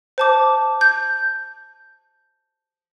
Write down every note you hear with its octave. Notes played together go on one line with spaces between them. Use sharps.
C5 A5 D6
G6